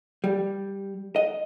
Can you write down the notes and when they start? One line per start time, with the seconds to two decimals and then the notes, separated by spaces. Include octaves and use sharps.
0.24 G3
1.16 D#5